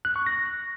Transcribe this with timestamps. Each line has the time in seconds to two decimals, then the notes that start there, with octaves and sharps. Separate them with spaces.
0.05 F#6
0.16 C#6
0.26 A#6